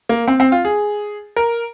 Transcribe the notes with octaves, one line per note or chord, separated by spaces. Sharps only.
A#3
C4
C4
F4
G#4
A#4